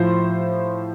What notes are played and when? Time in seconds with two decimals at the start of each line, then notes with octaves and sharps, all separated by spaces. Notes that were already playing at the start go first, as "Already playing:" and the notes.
Already playing: A2 F3 C5